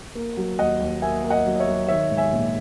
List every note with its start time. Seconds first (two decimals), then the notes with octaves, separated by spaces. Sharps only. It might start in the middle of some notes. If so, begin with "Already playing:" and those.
0.15 A#3
0.37 F#3
0.59 D#2 D#5 F#5
0.80 D#2
1.02 A#3 E5 G#5
1.24 A#3
1.30 D#5 F#5
1.46 F#3
1.56 D#5
1.60 C#5 E5
1.67 F#3
1.88 D#3 C#5 E5
2.11 G#2
2.17 E5 G#5
2.33 A#1